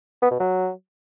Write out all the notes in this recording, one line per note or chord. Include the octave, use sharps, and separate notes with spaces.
B3
B2
F#3